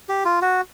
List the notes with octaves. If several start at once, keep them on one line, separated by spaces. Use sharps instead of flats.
G4
F4
F#4